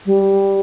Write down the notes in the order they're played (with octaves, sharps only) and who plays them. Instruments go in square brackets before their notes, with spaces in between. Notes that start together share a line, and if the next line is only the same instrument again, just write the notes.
[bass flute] G3